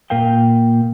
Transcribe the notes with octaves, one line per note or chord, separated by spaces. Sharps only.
A#2 A#4 F5 G5